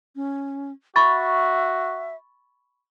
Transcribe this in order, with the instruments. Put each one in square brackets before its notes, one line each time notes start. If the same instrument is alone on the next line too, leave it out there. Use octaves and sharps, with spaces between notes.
[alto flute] C#4
[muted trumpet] F#4 [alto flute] E5 [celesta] B5 C#6 A6